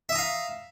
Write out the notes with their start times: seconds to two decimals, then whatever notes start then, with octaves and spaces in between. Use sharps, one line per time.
0.09 E5
0.12 D#6
0.15 A#5
0.18 F5